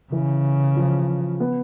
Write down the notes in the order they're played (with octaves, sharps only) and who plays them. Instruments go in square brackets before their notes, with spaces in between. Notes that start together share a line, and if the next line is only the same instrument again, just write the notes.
[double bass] C#3 [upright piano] E3
[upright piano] F3
B3